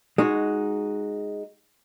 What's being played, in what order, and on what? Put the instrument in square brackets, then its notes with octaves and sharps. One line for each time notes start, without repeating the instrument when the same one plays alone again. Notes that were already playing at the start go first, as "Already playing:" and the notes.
[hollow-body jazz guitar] G#3 D#4 F#4